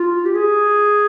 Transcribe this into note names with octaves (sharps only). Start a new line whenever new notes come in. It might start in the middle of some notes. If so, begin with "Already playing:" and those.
Already playing: F4
G4
G#4